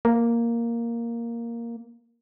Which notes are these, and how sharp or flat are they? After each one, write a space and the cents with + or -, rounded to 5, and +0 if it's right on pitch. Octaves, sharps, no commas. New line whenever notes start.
A#3 +0